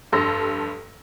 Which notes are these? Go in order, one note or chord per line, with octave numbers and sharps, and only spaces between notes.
F1 G2 A4 C6 E6 A#6